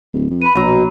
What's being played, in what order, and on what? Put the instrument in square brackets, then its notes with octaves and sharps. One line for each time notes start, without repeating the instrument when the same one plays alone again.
[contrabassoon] D1
F2
[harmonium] B4 [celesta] B5 D#7
[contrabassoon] A#1 [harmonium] B2 [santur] F#3 A#5